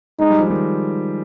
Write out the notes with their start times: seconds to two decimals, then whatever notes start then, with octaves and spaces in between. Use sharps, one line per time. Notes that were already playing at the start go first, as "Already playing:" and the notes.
0.19 G#3 D#4
0.30 G3
0.40 F3
0.50 D#3 G3